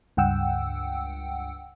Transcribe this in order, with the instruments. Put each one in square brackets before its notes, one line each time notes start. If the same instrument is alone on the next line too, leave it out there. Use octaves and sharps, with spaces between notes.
[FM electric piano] C#2 G2 F#5 G5 E6